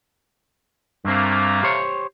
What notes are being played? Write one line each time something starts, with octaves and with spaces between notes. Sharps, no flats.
C2 G2 A3 A#3 C4
G4 C5 C#5